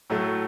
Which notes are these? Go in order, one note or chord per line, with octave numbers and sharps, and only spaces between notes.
A2 F#3 A3